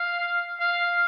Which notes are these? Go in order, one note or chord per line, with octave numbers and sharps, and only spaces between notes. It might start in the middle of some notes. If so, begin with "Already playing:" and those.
Already playing: F5
F5